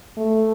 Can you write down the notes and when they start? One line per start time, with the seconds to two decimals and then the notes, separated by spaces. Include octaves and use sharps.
0.18 A3